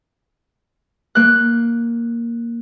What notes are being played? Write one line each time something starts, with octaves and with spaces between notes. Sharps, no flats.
A#3 F#6